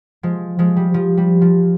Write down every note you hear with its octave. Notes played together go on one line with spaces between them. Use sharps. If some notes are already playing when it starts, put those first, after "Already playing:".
F3 G#3
F3 G#3
G3
F3
G3
F3